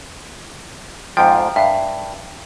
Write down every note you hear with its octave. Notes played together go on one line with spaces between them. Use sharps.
F2 G#2 F3 G5 D7
G2 E5 F5